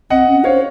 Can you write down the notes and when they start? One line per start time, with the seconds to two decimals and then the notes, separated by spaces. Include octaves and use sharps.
0.10 C4 D#5 F#5
0.28 C#4
0.44 C5 C#5 F5